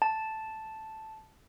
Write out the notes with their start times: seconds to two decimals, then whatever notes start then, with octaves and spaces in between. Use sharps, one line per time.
0.02 A5